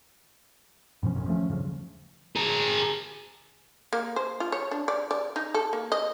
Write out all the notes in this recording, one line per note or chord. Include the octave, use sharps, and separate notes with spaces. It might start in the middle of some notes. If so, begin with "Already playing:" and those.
F#2 B2 F3 C#4
A1 D#3 C#4
F3 A3 C#4
D#1 G2 C#3 F3
G#4 A#4
A#3
C5
F4
C#5
D4
D5
D5
D#4
A4
A#3
D#5